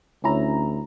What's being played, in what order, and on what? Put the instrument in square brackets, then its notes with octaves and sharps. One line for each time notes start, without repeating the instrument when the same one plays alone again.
[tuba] D2 [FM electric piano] C#4 E4 A#5